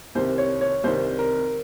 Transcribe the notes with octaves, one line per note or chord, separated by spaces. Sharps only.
C2 C3 D#3 C5
C#5
C#5
C2 C3 D#3 C5
A#4